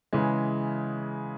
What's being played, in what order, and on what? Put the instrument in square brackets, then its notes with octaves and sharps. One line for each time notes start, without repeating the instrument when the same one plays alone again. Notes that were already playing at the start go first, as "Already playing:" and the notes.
[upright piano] C#3 E3 G#3